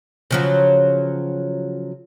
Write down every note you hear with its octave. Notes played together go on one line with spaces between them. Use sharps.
C#3 F3 F#3